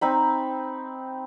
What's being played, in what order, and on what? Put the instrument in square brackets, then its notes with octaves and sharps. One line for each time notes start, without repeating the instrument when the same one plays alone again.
[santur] C4 D#4 B5